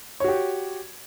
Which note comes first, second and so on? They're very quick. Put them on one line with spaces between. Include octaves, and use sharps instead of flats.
C#5 F#4 G4